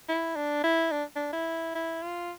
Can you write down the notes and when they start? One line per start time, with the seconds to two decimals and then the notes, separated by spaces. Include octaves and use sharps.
0.09 E4
0.36 D4
0.64 E4
0.92 D4
1.16 D4
1.33 E4
1.75 E4
2.03 F4